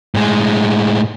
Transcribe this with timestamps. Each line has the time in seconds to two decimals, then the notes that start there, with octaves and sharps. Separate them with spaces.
0.15 A2 G#3